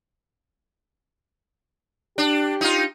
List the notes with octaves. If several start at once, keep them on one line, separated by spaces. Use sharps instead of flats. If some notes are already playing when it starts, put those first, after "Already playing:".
D4 G4
D#4 F4